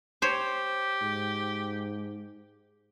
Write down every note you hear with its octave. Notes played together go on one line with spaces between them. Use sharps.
G4 C5 C#5
G#2